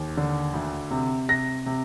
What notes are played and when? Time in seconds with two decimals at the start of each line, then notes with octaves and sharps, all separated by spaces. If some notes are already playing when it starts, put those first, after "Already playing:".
Already playing: D#2
0.17 D3
0.54 D2
0.91 C3
1.28 C3 A#6
1.66 C3